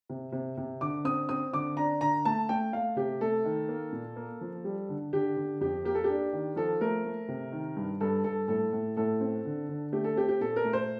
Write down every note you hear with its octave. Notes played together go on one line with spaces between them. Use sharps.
C3
C3
C3
D3 D6
C4 D#6
C4 D#6
D3 D6
D4 A#5
D3 A#5
A3 A5
A3 G5
A3 F5
C3 G4
A3 A4
D#3
A#3
A#2
A#3
F3
G3
D3
D3 G4
D3
F2 G4
A#3 G4
A4
D4 G4
D#3
F3 A4
A3 A#4
A3
C3
D#3
G2
G2 A4
G2 A4
A2 A4
A2
A2 A4
C4
D3
D3
A3 G4
A4
C4 G4
G4
A#2 A4
A#4
A3
C5